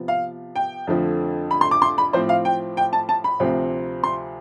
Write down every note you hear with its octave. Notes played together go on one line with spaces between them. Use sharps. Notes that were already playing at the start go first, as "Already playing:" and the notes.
Already playing: C3 F3 B3
F5
G5
F2 D3 F3 A3
B5
C6
D6
C6
B5
A2 F3 C4 C5
F5
G5
G5
A5
A5
B5
D2 C3 F3 C4
C6